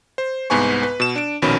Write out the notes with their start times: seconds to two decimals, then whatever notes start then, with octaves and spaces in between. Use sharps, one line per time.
0.18 C5
0.50 C2 G#2 B3 B4 G#5 C#6
0.83 B4
1.00 B2 E7
1.16 D4 D7
1.42 A#1 B2 D#3 C#4 B5